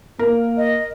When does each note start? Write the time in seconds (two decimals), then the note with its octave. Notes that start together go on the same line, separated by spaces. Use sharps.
0.19 A#3 A#4
0.57 D#5